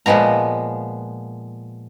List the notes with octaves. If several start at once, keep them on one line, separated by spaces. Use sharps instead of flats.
A#2 F3 G#3 B3 A#5